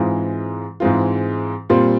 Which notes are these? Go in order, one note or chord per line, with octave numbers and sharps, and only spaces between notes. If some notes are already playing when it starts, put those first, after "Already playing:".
Already playing: G#2 E3 G#3 C4 F4
G#2 E3 G#3 C4 F4
A#2 G3 C4 F4